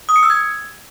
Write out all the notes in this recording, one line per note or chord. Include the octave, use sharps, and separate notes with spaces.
D#6
C#7
E6
G#6